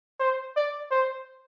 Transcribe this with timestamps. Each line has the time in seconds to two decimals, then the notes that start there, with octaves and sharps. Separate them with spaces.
0.20 C5
0.56 D5
0.91 C5